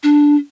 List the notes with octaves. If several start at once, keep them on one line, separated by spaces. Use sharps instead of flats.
D4